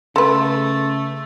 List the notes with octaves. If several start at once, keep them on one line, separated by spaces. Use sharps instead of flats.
C#3 A3 A4 B4 C6